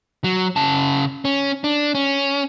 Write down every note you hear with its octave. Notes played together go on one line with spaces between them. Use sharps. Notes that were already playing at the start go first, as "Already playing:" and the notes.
F#3
C#3 A5
C#4
D4
C#4